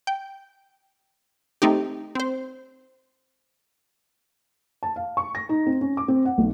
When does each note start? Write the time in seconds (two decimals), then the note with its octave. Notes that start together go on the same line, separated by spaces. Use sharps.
0.07 G5
1.62 A3 C4 D#4 G4
2.15 C4 C5
4.83 A5
4.96 F5
5.17 C#6
5.35 A#6
5.49 D#4
5.66 C4
5.81 C#4
5.97 D6
6.08 C4
6.25 F#5
6.38 B1